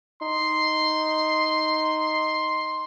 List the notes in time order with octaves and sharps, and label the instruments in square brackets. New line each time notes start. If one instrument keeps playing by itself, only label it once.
[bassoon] D#4 [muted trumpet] C6